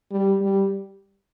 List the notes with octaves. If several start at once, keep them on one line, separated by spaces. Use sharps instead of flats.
G3
G3